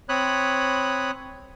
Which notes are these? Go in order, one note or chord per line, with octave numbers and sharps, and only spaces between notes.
C4 C#5 B5 D#6 F#6